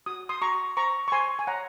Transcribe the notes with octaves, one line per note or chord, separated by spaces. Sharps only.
F#4 D#6
C6 D#6
F#4 A#5 C#6
C5 A#5 C#6
C#6
C5 G#5 C6
G#5
C#5 F#5 A#5